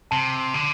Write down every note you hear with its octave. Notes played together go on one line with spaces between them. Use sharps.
C3 A5
D3